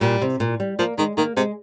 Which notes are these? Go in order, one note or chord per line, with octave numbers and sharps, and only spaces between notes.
A#2 G3
C3
A#2
G3
F3 A#3
D#3 G#3
D#3 A#3
C3 G#3